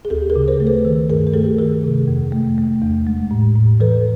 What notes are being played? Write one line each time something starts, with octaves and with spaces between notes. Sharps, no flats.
G#4
D2 G4 A4
G#4 A#4
C#3
A#4 C5
A3
A4 B4
D#3
G2 G#4 A#4
A#4
A3 G4 A4
D#3 G#4 A#4
C3
F2
A3
A3
E2
G#3
A2
A2
E3 A4 B4